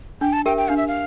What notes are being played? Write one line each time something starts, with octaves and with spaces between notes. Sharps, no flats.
D4 G5
A5
G4 A#4 E5 G5
G5
D4 F5
E5
F5